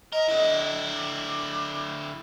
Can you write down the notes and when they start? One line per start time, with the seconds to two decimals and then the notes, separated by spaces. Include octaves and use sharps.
0.13 A#4 D#5
0.29 D3 E4
0.93 D6